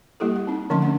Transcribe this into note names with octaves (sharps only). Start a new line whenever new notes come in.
G3 A#3 E4 G4 A4
F#5
C4 D#4
D3 F3 A3 C#4 D#5 C6
C#4 D4 F#5